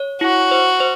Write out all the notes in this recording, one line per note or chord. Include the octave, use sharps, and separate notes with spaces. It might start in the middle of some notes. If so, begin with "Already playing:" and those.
Already playing: C#5
E4 F#4
C5
C5